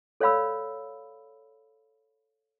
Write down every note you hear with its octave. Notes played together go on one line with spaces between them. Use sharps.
A4 C#5 D5 F5 B5 E6